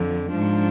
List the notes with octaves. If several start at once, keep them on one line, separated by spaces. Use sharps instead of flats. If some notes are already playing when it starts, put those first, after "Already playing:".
Already playing: F2 D3 F3
F3 D4
G#2